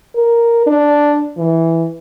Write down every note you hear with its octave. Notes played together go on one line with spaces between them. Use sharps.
A#4
D4
E3